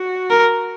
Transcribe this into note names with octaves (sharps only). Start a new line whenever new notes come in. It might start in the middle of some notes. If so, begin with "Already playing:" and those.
Already playing: F#4
A#4